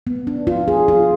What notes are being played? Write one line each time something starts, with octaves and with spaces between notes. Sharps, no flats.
B3
D4
F4
G#4
F4